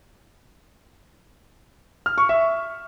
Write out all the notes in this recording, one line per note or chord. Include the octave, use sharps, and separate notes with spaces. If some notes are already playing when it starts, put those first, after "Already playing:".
F6
C#6
E5